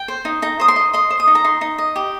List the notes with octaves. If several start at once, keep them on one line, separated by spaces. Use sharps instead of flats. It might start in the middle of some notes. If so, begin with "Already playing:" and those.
Already playing: G5
C5
D#4
D#4 A#5
C5 D#6
C6
D#5
D#5 C6
C5
D#6
D#4
A#5
D#4 C6
D#4
D#5
G4